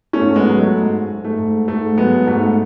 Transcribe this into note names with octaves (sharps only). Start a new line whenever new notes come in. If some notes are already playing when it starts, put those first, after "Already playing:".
A3 C#4
G#2
G#3 B3
F#3
A3
G#2
G#2
A3
G#2
G#2 A3
F#3 G#3 B3
G#2 A3